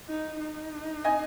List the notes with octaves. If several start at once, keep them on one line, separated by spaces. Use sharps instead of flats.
D#4
D#4
D#5 G#5